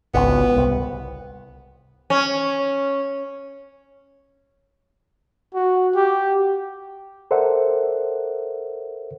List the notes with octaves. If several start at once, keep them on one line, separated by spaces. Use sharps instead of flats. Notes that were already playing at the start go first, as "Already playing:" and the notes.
G#1 C#2 B3
C2
C#4
F#4
G4
A4 A#4 C5 D5 E5 F#5